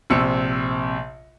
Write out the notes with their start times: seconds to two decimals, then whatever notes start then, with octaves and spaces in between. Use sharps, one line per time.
0.10 A#1 C3 E6 C#7